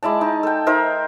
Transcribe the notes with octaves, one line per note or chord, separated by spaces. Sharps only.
G#3 E4 D5 A5
D#4
A4 G5
D#4 A#4 C5 E5